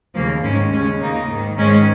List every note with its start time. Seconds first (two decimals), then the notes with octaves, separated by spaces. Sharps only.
0.15 D#2 C#3 F3 A#3
0.43 G#2 D#3 G#3 C#4
0.71 D#2 G#3 C#4
0.76 C#3
1.00 D#2 C#3 A#3 D#4
1.29 G#2 D#3
1.58 G#2 D#3 G#3 C#4